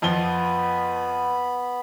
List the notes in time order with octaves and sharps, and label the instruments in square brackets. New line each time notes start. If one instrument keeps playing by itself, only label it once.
[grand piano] F2 F3 G7 [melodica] B3 B5